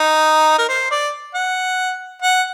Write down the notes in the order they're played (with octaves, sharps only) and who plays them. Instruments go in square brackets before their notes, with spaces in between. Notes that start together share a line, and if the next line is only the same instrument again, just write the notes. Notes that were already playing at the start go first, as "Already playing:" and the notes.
Already playing: [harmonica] D#4
A#4
C5
D5
F#5
F#5